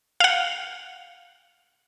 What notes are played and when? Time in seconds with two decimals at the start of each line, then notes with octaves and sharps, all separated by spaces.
0.20 F5 F#5